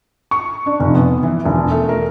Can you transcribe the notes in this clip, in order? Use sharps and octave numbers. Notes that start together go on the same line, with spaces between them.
C#6
D4
F1
B3
E3
E1
A3
A#4